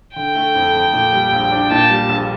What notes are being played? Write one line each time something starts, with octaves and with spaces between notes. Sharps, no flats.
D3 G5
A3
F2
F2
A#2
G3
A#1
D4
A#2 A5
G3
A#1